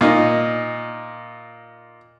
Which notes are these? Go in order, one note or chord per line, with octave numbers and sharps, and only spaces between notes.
A#2 D#4